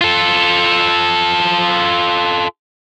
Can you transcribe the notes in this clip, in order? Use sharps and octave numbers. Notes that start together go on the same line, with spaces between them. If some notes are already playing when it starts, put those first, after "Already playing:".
F4 A4